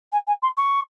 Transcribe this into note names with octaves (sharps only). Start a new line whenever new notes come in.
G#5
G#5
C6
C#6